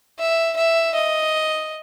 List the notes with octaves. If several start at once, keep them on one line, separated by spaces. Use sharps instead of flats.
E5
E5
D#5